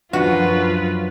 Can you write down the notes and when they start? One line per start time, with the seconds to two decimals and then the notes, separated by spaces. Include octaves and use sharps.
0.13 F#2 F3 F#3 D4 F4 F#4 B4